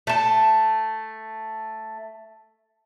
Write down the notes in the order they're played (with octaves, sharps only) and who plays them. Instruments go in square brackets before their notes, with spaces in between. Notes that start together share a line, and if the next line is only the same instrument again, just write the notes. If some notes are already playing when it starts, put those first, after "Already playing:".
[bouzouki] A3 A5